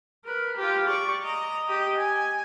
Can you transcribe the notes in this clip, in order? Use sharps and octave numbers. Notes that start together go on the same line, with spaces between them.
A#4 B4
F4 G4
D5 C#6
D#5 A#5
G4 D#5
G#5